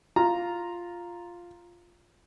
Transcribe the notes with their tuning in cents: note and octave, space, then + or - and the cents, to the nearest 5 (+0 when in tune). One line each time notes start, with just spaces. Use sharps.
F4 +0 A#5 +0